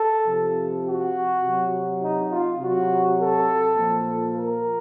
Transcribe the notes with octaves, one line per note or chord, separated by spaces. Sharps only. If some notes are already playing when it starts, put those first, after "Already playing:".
Already playing: A4
C3 F3
F#4
C3 F#3
D#4
F4
C3 F#3 F#4
A4
A#2 F3
A#4